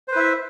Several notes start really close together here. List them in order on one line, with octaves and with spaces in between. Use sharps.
C5 B4 E4 E5